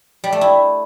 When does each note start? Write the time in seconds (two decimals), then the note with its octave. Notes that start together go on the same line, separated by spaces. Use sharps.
0.24 G3
0.32 A3
0.41 E4